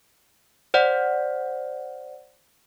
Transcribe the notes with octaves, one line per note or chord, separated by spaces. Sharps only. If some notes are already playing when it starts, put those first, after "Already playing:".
C5 D5 F#5